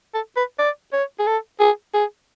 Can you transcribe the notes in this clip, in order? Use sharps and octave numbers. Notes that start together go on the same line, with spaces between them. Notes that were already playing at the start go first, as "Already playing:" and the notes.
A4
B4
D5
C#5
G#4
A4
G#4
G#4